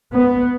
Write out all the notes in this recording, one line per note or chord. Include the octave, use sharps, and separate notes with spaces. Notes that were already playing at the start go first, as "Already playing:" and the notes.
B3